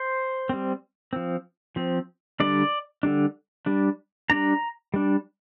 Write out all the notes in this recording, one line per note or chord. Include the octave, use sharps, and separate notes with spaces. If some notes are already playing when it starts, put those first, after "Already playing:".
Already playing: C5
G3 C4
F3 C4
F3 C4
D3 G3 D4 D5
D3 G3 D4
G3 D4
G3 D4 A#5
G3 D4